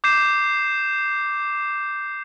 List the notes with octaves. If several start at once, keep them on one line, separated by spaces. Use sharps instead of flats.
D6 G6 C7 E7